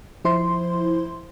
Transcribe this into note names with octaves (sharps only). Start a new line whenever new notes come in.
F3 E4 C5 C6